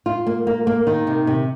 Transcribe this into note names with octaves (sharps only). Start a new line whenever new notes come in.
F4
A#3
A#3
A#3
D#3
C3
C3